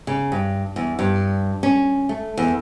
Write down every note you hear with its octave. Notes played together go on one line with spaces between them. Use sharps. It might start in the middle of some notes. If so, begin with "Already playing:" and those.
C#3
G2
E2
G2
C#4
A3
E2